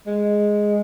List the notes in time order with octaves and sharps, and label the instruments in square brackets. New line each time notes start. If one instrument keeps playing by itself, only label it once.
[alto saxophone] G#3